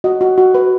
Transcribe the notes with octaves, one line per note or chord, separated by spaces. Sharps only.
F#4 D#5
F#4
F#4
B4